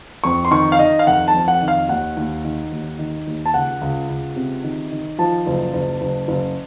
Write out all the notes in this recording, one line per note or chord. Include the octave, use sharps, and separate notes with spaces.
F2 C#6
C6
D#3 C#6
F5
D#3 D#5
F5
F1 F#5
A5
F2
F#5
D#3
F5
D#2 F#5
D#2
D#3
D#2
D#3
D#2
A5
C#2 F#5
C#2
C#2
C3
D#3
D#3
F3 A5
F#1
F#1
F#1
F#1